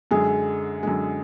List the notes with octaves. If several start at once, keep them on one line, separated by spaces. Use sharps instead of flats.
F#2 D3 G#3 G#4
F#2 D3 G#3